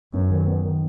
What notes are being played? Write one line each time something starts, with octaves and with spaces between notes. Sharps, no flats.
F#2 B3
D#3
B3
D#3